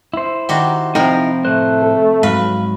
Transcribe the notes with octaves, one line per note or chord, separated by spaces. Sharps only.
E4 C5
D#3 F#4 G4
C3 F3 D#4 E4 A#4 D#5 G5
A2 A3 C5 F#6
A4
G#2 F#3 B4 F5